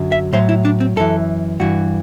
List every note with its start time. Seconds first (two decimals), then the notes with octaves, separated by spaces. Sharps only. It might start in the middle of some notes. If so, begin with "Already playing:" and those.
Already playing: F#2 D3 F#3
0.12 E5
0.33 A2 F#3 C5
0.49 E4
0.65 D4
0.80 C4
0.96 F#2 E3 A4
1.60 G2 E3 F#4